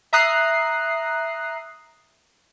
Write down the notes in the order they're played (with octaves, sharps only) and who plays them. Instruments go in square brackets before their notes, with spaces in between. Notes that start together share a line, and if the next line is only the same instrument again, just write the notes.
[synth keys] E5 A#5 D#6 F#6 C7